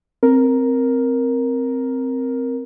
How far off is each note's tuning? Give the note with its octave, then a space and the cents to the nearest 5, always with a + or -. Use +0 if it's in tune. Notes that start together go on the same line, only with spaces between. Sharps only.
C4 +0 A#4 +0